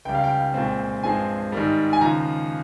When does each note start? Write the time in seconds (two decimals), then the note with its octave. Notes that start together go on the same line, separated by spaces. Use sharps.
0.05 C#2 C#3 G3 G5
0.15 F5
0.24 G5
0.54 C2 A#2 G#3 C4
1.03 G2 F3 G#3 C4 G#5
1.52 G#2 D#3 G3
1.93 G#5
2.01 D#2 C#3 F3 A#5